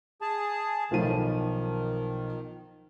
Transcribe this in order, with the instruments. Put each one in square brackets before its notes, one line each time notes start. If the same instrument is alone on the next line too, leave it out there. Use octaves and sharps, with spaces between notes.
[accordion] G#4 A5
[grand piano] B1 F3 D#7 [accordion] A2 D#3
[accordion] D#3